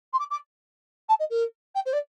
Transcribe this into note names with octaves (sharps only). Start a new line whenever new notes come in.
C6
D6
D6
A5
D#5
A#4
G5
C5
D5